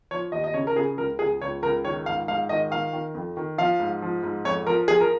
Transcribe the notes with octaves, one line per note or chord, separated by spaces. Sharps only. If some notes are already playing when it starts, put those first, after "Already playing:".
F3 C#5
D#2 D#5
D#5
C#3 C#5
A#4
C#3 G#4
C#2 A#4
C#2 G#4
C#2 C#5
C#2 A#4
D#3 C#5
G#2 F5
G#2 F5
D#3 D#5
D#3 F5
D#3
F2
D#3
F3 F5
G#2
F3
G#2
F2 C#5
F3 A#4
F3 G#4
A#4